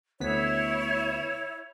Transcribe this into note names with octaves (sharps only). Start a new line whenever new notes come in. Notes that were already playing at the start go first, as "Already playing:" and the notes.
D2 B3 E4 C#5 B6